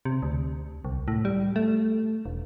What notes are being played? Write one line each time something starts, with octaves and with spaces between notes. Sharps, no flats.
C3
D2
C2
A2
G3
A3
E1